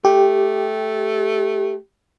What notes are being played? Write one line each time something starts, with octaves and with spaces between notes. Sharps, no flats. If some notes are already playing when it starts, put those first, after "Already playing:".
A3 G4